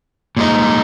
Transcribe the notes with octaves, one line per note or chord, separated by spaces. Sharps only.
A#2 G#3 D#4